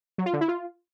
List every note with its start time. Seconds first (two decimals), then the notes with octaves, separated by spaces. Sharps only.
0.18 F#3
0.26 F4
0.33 D3
0.41 E4
0.48 F4